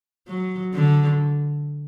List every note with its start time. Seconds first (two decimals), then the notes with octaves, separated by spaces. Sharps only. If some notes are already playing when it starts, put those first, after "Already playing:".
0.28 F#3
0.74 D3